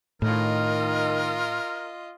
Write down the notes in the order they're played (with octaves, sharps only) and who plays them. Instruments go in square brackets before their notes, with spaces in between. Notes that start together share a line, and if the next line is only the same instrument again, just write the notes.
[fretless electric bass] A2 [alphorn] D#3 [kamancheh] F4 D#5 [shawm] A#4